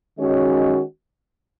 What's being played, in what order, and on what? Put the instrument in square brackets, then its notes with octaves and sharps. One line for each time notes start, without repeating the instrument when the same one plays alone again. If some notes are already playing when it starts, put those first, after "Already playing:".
[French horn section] D#3 G#3 C#4 F#4 C#5